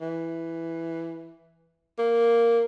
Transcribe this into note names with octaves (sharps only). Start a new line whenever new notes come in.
E3
A#3